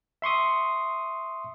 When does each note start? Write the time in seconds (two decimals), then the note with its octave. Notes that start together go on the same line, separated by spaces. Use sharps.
0.22 E5 C6 C#6 D#6